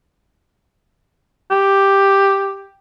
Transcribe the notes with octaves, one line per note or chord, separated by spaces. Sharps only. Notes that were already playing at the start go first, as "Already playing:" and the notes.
G4